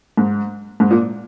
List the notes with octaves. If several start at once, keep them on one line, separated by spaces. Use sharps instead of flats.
G#2
G#2
A#2